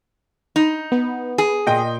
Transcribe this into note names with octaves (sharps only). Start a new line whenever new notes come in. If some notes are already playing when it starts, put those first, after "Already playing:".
D#4
B3
G#4
A#2 D#5 G5